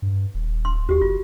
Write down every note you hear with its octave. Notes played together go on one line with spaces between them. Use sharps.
G2
D#1
D1 C6
D#2 F#4 G4
F#1 F4